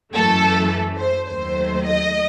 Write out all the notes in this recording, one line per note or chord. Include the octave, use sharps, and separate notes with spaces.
F#2 E3 A3 A4
C5
D#2 D#3 F#3 A3 C5
D#5